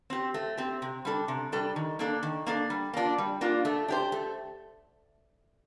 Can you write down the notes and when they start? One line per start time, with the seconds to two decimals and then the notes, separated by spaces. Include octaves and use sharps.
0.10 C4 G4
0.34 A3
0.57 C4 G4
0.82 C3
1.05 G3 D4 A4
1.28 C3
1.52 G3 D4 A4
1.76 D#3
1.99 A#3 D4 A4
2.23 D#3
2.47 A#3 D4 A4
2.70 G3
2.93 A#3 D4 F4
3.18 G3
3.41 A#3 D4 F4
3.65 A3
3.88 D4 G4 C5
4.12 A3